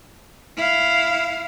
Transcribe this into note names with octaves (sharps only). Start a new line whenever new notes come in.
E4 F5